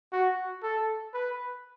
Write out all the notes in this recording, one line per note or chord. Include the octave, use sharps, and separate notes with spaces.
F#4
A4
B4